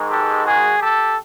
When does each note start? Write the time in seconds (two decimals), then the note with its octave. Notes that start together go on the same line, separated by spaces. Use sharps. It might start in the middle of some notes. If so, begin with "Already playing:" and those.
Already playing: G#2 D#3 G#3
0.09 G4 A4
0.44 F#4 G#4
0.79 G4 A4